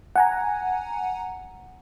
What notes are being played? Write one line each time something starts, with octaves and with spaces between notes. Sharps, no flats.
F#5 G#5 A#5